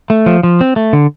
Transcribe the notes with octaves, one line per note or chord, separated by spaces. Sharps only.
A3
F3
F3
C4
A3
D3